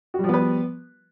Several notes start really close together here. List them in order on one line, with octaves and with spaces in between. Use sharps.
F#4 G3 F3 B3 B4